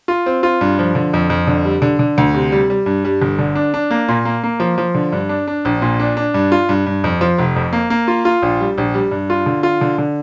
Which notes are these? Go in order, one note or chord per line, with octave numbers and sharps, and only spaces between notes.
F4
C4
F4
G2
F3
D3
F2
F2
D3
G3
D3
D3
D2
C3
G3
G3
G2
G3
G1
D3
D4
D4
A#3
A#2
A#3
A#3
F3
F3
D3
G2
D4
D4
A#1
A#2
D4
D4
G2
F4
G2
G2
F2
F3
F1
F2
A#3
A#3
F4
F4
A#1
G3
A#1
G3
G2
F4
D3
F4
D3
D3